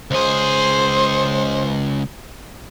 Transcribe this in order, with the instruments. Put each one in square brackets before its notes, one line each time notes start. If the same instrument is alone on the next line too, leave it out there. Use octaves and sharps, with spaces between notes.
[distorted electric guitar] C#2 G#4 [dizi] C5